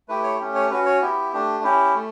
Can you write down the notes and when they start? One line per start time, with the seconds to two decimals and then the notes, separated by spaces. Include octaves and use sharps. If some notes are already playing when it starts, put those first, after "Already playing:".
0.09 A3 E4 G4 B4
0.24 C#5
0.40 A3 C#4 G4
0.55 C#5
0.71 C#4 F#4 B4
0.86 C#5
1.02 B3 E4 G4
1.33 A3 D4 G4
1.64 C#4 E4 G4
1.95 A3